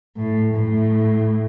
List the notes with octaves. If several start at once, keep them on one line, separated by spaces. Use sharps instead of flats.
A2
A2